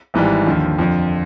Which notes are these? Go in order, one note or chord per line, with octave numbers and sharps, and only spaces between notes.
G#1 G#2 E3 G3
D#2 D3 F3
F2 D3 F3